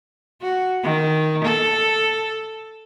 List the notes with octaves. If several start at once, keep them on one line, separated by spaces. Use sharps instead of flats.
F#4
D#3
A4